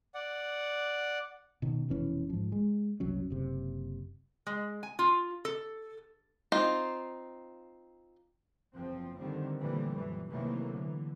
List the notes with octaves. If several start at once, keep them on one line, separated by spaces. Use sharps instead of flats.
D5 F#5
B2 D#3 C#4
F1 B2 E3 C#4
G#2 F3
G#3
F#1 C2 F#3 C#4
F#1 C3
G#3
G#5
F4
A4
C4 D#4 F4
F#1 E2 F3 C4
D3 D#3 G3 C4
A#2 D3 E3 F3 G3 A3
F#2 A#2 E3
C3 D#3 E3 F#3 A3 A#3
D3 E3